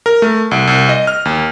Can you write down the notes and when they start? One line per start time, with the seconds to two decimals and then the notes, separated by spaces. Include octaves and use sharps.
0.06 A#4
0.22 A3
0.51 C2
0.67 C2
0.89 D#5
1.07 F6
1.25 D#2